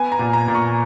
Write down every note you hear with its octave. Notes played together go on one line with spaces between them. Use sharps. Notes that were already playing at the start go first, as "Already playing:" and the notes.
Already playing: B3 G#5
A#5
A#2
A#5
A#2
C#6